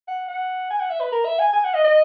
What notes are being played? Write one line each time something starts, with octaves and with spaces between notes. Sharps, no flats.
F#5
F#5
G#5
F#5
E5
B4
A#4
E5
G#5
G#5
F#5
D#5
D#5